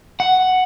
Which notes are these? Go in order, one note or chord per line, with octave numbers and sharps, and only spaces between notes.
F#5